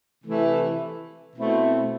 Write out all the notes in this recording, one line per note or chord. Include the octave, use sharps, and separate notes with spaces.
C3 E3 A3 E4
B2 A3 C4 E4